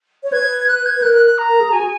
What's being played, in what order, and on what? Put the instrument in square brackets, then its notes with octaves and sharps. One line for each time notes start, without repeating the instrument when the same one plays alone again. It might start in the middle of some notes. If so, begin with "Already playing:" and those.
[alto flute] C#5
[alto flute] B4 [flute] G#6
[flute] F#6
G#6
[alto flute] B4
[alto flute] A#4 [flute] F#6
[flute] F#6
F#6
A#5
[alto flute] A#4
G#4
[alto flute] F#4 [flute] G#5
[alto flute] G#4